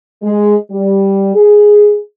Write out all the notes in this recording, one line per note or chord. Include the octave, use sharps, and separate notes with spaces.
G#3
G3
G#4